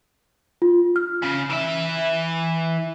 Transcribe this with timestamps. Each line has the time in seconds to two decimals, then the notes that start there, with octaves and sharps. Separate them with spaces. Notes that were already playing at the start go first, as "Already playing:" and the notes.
0.62 F4
0.96 F6
1.22 C#3
1.50 E3 E5